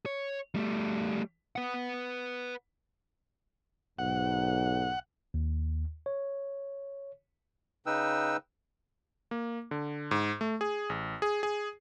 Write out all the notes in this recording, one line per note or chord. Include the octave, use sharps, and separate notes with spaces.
C#5
G3 A3
B4 F#5
B1 G#2 F#5
D#2
C#5
C#3 D#4 B4 G5 E6
A#3
D3
G#2
A3
G#4
A1
G#4
G#4